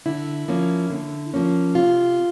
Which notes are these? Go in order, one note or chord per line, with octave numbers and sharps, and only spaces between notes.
D3 E4
F3 A#3 C#4
D3
F3 A#3 C#4
C3 F4